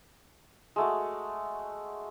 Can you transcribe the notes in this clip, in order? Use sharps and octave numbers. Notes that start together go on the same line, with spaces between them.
G#3 A3 F#4